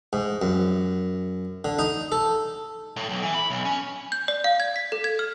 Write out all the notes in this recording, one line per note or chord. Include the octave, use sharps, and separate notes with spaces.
G#2
F#2
D3
D#4
A4
A2
B1
E3
B5
B1
C#4
G6
D5
F5
G#6
B6
A4
G#6
F6